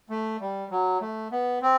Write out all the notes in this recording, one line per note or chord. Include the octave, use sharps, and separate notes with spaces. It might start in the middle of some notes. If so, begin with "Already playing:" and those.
A3
G3
F#3
A3
B3
C4